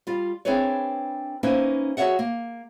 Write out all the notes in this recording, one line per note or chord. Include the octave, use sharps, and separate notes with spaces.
G3 F4
C4 D4 E4 G#4 B4 C#5
A#3 C#4 D#4 E4 B4 C5
F#4 G#4 B4 C#5 E5 F#5
A#3